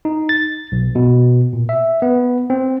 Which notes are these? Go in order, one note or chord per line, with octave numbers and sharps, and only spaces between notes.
D#4
A6
B1
B2
A#2
E5
B3
C4